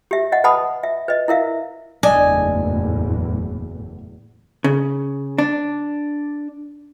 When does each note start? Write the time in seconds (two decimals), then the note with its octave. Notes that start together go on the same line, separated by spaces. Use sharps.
0.11 G4 E5
0.32 D#5 F#5
0.44 B4 F#5 A5 B5 D#6
0.83 E5
1.08 B4 D#5
1.28 E4 A#4 E5 F5
2.03 F#1 E2 A2 D4 D#5 G#5
4.64 C#3
5.38 D4